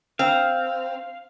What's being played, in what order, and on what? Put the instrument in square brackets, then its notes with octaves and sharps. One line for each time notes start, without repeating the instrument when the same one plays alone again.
[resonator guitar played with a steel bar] C4 [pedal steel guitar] F5